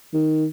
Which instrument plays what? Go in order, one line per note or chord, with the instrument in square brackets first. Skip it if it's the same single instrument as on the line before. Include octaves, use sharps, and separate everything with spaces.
[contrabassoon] D#3